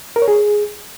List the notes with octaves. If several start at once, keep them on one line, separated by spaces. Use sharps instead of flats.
A#4
C#5
G#4